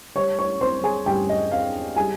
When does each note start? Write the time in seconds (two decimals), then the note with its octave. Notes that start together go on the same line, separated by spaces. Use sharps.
0.16 G3 C#5 C#6
0.39 C#5 C#6
0.61 C4 C5 C6
0.84 G#4 G#5
1.06 G2 G4 G5
1.29 D#5
1.52 C4 F5
1.96 G3 G#4 G#5